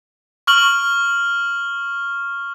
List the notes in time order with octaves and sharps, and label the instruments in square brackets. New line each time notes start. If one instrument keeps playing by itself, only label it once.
[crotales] C#6 F6 F#7